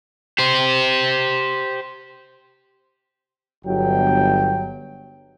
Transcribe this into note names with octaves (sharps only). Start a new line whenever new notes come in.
G4 C5
G1 F#3 G5